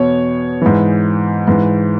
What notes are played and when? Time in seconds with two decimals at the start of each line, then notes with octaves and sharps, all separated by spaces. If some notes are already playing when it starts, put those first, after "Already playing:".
Already playing: E2 B2 C#5
0.62 G#2 E3
1.48 G#2 E3